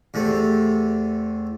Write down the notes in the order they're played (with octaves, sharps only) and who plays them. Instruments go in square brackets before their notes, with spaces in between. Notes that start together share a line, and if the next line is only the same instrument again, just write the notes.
[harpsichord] E2 C3 A3